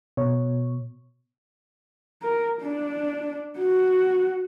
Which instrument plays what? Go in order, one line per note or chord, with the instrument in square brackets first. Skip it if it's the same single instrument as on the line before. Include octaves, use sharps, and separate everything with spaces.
[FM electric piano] B2 C#5
[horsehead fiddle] A#4
D4
F#4